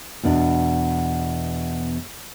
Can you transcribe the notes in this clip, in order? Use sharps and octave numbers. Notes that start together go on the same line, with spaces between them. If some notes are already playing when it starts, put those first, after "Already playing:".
E2 B2 D4